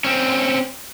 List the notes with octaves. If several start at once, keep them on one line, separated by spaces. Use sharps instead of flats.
C4 C#4